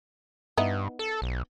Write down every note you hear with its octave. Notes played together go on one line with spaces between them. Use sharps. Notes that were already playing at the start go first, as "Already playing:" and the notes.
G2 B3 D#4 E4
A4
B1